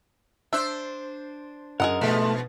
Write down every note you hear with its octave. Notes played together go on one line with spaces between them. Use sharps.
D4 C5 E5
F#2 G#4 A#4 D#5 F#5
G#2 B2 F3 A3 B4